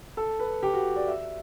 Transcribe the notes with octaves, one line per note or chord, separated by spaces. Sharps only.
A4
B4
G4
F#4
D5
E5